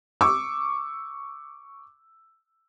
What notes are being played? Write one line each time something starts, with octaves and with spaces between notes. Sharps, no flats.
C#6 D6 E6